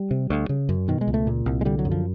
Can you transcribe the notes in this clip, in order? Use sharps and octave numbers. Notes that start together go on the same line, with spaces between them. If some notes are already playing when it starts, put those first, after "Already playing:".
Already playing: G3
C3
D2
C#3
F#2
B2 D#3
G#3
C#2
A3
A#2
C2
G#3
D3 G3
F#3
F#2
F3